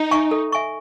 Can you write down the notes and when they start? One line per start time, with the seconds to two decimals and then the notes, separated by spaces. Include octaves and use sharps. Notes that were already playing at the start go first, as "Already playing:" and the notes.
Already playing: D#4
0.11 E5 G#5 C#6
0.31 A4
0.52 E5 G#5 C#6